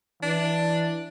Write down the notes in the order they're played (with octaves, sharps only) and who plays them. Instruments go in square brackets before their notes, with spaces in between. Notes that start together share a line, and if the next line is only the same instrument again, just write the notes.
[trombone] E3 [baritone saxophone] D4